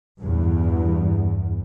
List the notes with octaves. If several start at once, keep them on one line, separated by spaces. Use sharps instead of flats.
E2 G2